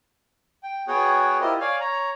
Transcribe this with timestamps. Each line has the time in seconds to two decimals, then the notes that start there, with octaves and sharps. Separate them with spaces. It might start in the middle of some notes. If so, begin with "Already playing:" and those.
0.63 G5
0.88 B3 F#4 G#4 C#5 F#5 G5
1.41 E4 F4 G4 A#4 C5 D#5
1.60 C#5 D5 F5 G#5
1.80 C#5 A#5